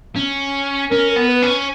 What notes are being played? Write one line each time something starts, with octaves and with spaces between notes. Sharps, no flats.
C#4
C#4 A#4
A#4
B3
B4
C#4